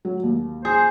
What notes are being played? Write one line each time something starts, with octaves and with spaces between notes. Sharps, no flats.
F#3
D#2
G#4 C5